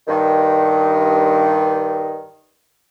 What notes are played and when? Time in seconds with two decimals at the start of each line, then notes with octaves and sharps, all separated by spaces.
0.08 G2 D#3